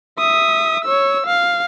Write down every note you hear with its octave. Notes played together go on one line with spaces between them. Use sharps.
E5 D#6
C#5 E6
F5